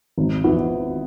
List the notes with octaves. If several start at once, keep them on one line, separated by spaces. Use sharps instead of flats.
G#1
E3 B3